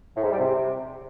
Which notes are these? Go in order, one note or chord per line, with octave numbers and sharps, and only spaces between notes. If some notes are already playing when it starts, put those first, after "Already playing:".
A2
G#2
G3
C3